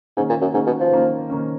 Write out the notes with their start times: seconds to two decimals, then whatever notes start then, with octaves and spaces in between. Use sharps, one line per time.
0.17 G#2 D#3 A#3 C#4
0.29 A#2
0.41 F#2
0.54 G#2 D#3 A#3 C#4
0.67 B2
0.80 F3
0.92 D#3 A#3 C#4
1.30 D#3 A#3 C#4